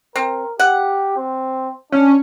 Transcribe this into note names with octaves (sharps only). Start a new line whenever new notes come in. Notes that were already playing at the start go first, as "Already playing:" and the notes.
C4 A#4
G4 F#5
C4
C#4 D4